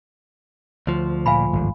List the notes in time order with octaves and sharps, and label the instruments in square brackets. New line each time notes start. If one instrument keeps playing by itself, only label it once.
[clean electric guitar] D2 F3 [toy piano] C#5
[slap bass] A#2 [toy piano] F5 G#5 B5
[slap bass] G#1 G2 D3